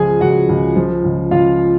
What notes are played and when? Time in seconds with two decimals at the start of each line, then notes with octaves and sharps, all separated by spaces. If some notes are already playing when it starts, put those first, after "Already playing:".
Already playing: C#2 F3 G#4 G#5
0.21 C#2 F#4 F#5
0.49 C#2
0.76 F3
1.04 C#2
1.31 C#2 F4 F5